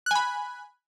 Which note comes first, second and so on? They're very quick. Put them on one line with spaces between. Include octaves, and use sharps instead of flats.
F#6 G#5 B5